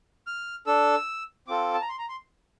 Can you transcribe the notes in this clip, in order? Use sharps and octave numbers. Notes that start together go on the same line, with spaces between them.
F6
D4 A4 E6
C4 F4 A4 D6
A5
A#5
C6
A#5
C6